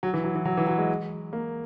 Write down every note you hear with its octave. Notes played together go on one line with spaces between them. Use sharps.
F#3
E3
F#3
E3
F#3
E3
F#3
G#3
A#3